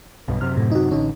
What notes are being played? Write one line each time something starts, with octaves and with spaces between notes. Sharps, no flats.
B1 G2 B2
F#2 C3 F6
A2
D#4 F#4
A1 D3 C#4 D#4